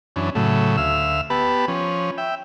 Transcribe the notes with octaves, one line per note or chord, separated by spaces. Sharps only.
F#2 E3 C#4 D4
A2 C#3 F#3 A3
D2 E5 F5 E6
B3 G4 B4 A5 B5
F3 C#4
E5 G5